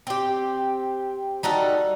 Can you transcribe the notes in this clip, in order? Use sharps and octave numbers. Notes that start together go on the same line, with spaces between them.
C4 G4
G3 D#4 F#4 A4